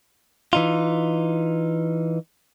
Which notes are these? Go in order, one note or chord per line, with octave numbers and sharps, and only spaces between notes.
E3 D#4 F4